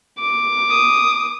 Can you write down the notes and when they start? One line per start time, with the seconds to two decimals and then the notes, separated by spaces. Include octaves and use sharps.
0.21 D6
0.70 D#6